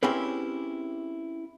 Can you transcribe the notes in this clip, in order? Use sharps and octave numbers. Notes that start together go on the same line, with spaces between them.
C4 C#4 E4 G4 G#4 B4